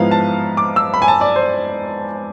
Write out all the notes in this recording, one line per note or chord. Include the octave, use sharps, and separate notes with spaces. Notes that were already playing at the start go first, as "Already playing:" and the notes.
Already playing: G#2 F3 B3 E4 F5
A5
D6
E6
B5
G#5
A5
D5
C5